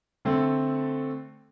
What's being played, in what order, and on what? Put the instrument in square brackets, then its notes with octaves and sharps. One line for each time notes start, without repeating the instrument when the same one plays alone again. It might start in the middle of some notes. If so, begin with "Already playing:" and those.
[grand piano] D3 A3 C4